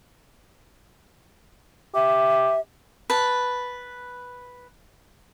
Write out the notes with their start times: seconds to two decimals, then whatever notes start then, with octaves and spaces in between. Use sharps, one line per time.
1.95 G4 E5
3.10 B4 A5